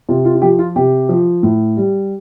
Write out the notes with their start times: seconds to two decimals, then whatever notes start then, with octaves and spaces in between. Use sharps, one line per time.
0.09 C3 F4
0.25 F4
0.35 F4
0.42 F3 G4
0.59 F4
0.76 C3 G4
1.09 F3
1.43 A2
1.77 G3